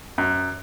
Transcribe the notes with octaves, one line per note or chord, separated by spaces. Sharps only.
F#2